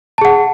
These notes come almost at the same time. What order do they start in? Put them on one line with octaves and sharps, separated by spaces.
A5 G#4 F#5